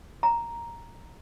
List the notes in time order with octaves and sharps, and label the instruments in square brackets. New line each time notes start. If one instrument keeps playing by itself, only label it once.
[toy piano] A#5